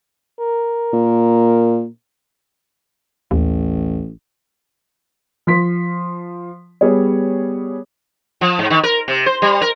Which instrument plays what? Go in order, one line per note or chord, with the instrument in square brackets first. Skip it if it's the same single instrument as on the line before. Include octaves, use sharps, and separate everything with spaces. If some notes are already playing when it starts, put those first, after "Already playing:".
[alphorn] A#4
[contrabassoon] A#2
[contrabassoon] A1 [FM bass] D#2
[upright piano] F3 C6 B6
G3 B3 G#4 C#5
[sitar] F3
G#2
D#3
A#4
C3
C5
G3
A#4